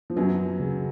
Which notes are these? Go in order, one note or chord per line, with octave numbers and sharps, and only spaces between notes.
F3
F#2 F#3 B3
C#3